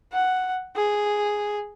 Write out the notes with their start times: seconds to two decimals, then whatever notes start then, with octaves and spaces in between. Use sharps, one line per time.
0.12 F#5
0.76 G#4